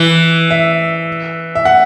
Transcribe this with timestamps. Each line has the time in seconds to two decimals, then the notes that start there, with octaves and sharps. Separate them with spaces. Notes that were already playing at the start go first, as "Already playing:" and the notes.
Already playing: E3
0.50 E5
1.55 E5
1.65 F#5